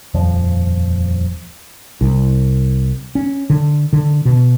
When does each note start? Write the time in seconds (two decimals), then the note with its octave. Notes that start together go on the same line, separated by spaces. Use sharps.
0.14 D#1 F2 F3
2.01 C2
3.15 C#4
3.50 D3
3.93 D3
4.25 B2